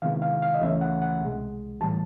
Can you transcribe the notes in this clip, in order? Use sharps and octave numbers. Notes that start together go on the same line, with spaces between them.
C3 D#3 G#3 B3 E4 F5
F5
F5
D#5
C#2 C#3 E3 A3 C#4 E5
F#5
F#5
C2 B2 G#3
A2 E3 G3 A5